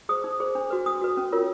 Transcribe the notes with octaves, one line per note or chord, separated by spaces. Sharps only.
G#4 C5 D#6
D#4
G#4 C5
D4
F#4 B4
D4 D#6
F#4 B4
C#4
F4 A#4 C#5